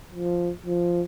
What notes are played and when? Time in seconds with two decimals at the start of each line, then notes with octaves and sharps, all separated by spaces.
0.15 F3
0.66 F3